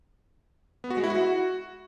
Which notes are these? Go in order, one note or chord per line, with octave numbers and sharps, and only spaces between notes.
B3
F#4
G#3
E4
F#4